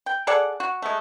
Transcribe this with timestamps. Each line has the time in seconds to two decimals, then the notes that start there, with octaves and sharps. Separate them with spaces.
0.06 G5
0.27 G#4 A4 D5 F#5
0.60 F#4
0.82 G#3 A3